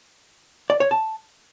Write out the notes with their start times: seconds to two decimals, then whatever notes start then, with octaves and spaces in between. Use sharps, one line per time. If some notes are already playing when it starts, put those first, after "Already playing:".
0.70 D5
0.80 C#5
0.91 A5